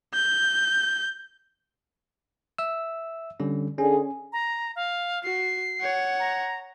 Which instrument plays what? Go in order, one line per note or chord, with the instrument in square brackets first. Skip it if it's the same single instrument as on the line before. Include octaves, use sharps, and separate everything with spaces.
[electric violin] G6
[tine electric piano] E5 E6
D3 G3 C#4
[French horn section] D3 G#4 [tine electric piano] C#4
[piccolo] A#5
F5
[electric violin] F#4 [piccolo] C7
[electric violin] C#5 F#5
[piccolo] A#5